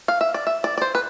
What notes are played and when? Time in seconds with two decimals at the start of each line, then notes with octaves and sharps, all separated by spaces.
0.08 F5
0.21 E5
0.34 D5
0.47 E5
0.64 D5
0.78 D5
0.82 C5
0.95 B4